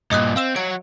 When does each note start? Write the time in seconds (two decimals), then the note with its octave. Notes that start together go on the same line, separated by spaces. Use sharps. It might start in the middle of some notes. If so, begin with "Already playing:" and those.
0.11 G2 A#2 D#5 D#6 F#6
0.36 C4 F5 E6 E7
0.56 F#3 C#5 D7